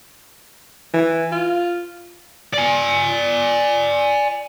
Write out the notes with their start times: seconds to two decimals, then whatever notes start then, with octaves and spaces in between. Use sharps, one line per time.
0.94 E3
1.32 F4
2.53 D5 G#5